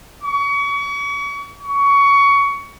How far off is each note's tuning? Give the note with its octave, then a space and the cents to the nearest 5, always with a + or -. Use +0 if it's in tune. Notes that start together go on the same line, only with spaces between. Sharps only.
C#6 +35
C#6 +20